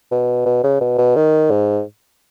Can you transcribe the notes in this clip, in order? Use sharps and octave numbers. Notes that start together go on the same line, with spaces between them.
B2
B2
C#3
B2
B2
D#3
G#2